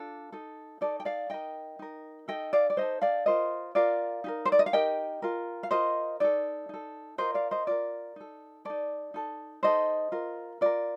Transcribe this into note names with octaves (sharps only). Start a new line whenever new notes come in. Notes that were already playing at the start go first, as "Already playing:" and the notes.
Already playing: D4 F4 A4
D#4 A4
D#4 A4 D5
G5
D5 F5
D#4 A#4 D#5 G5
D#4 A#4
D#4 A4 D#5 G5
D5 F5
D5
D#4 A4 C5 D#5
D5 F5
F4 A#4 C5 D#5
F4 A#4 D5 F5
D#4 G4 A#4
C5
D5
D#5
F5
D#4 G4 A#4 D#5 G5
F4 A#4
F5
F4 A#4 C5 D#5
D#4 A4 D5
D#4 A4
F4 A#4 C5 D#5
D5 F5
C5 D#5
F4 A#4 D5
D#4 A4
D#4 A4 D5
D#4 A4
D#4 A4 C5 D#5
F4 A#4
F4 A#4 D5